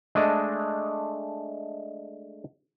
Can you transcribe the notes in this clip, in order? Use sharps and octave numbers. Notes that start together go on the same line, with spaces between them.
G#3 A3 D4 D#5